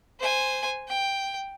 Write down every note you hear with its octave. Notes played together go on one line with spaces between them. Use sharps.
C5 G#5
G5